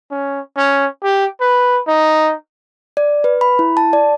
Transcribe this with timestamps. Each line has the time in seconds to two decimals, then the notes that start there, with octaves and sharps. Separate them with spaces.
0.11 C#4
0.56 C#4
1.03 G4
1.41 B4
1.87 D#4
2.97 D5
3.24 B4
3.41 B5
3.59 E4
3.77 A5
3.93 D5